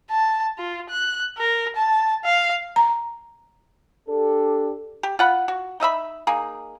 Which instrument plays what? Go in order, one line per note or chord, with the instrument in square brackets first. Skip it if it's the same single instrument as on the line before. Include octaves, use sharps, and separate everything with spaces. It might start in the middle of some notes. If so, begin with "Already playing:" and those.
[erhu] A5
F4
F#6
A#4
A5
F5
[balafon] A#5
[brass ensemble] D4 G4 A4
[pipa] G4
F4 F#5 B5
F#4
D#4 D#5 E5 B5
A#3 D#4 G#4